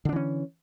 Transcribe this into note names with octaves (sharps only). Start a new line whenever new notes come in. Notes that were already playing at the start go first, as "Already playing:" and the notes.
D3 E3 C#4 D4